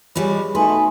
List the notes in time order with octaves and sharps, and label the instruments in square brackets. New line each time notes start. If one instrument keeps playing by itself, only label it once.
[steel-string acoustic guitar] E3 F3 G3 [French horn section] G#3 C#5 [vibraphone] B5
[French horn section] B2 A3 [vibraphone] D#4 G#5 C6 [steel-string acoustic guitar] B4